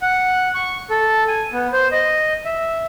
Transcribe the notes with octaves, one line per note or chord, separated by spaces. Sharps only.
F#5
C#6
A4
G#5
B3
C5
D#5
E5